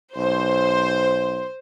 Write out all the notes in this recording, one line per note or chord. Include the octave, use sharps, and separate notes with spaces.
B1 C5